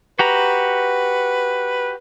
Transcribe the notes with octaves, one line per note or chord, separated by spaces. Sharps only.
F#4 G4 B4 A#5